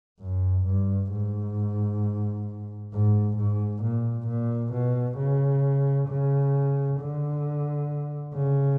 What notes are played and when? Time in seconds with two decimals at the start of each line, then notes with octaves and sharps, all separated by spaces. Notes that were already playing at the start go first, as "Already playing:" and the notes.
0.20 F#2
0.66 G2
1.12 G#2
2.93 G#2
3.37 G#2
3.83 A#2
4.28 A#2
4.73 B2
5.18 C#3
6.09 C#3
7.00 D3
8.34 C#3